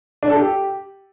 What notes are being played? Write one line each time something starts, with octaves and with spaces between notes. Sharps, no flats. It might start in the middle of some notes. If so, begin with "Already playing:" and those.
D4
A4
G4